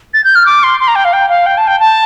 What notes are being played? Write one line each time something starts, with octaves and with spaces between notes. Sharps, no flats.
A6
G6
F6
D6
C6
C6
A#5
G5
F5
G5
F5
G5
A5
G5
A5